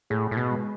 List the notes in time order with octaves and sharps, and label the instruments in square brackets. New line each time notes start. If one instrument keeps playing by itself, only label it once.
[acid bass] A2 [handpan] G#4
[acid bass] A2
B2
[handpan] G#3